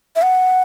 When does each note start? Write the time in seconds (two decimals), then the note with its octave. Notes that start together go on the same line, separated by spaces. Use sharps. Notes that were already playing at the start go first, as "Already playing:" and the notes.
0.16 E5
0.22 F#5